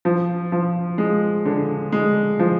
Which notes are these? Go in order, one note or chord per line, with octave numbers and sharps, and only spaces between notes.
F3
F3
G#3
D3
G#3
F3